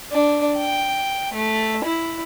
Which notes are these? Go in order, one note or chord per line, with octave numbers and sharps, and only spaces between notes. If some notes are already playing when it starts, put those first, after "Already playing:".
D4
G5
A3
E4